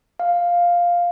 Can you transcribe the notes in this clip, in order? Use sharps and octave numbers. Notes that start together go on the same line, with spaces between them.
F5